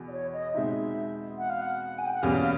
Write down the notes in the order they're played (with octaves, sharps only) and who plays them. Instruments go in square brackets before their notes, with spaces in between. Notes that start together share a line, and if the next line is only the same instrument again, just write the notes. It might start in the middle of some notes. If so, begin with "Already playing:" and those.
Already playing: [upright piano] E2 B2
[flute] D5
C#5
D#5
[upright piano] B2 G#3 C4 D#4 [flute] E5
[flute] F#5
F5
F#5
G#5
G5
F#5
[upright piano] E2 B2 G3 A#3 C#4 [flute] F5
[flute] F5